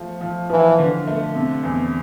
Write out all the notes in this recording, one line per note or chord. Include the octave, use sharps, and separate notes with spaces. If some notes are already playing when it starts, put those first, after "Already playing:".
Already playing: F3 A3
F3
E3 F3
D3
A3
C3
E2